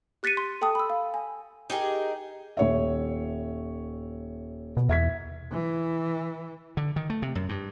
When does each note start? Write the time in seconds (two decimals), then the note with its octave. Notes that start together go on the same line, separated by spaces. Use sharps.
0.23 G4 F#6 A6 B6 C#7 D#7
0.37 C6
0.61 A4 G5 A5 D#6
0.75 B5 E6
0.90 F5
1.14 G#5
1.70 D#4 G4 G#4 A#4
2.57 D#1 C#5 E5
4.77 B2
4.89 E2 E5 G#6 B6
5.52 E3
6.77 D3
6.96 D#3
7.10 A3
7.22 C3
7.35 F#2
7.49 G2